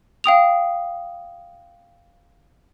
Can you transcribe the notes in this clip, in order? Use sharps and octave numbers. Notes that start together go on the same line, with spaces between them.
F5 G5 D#6 F7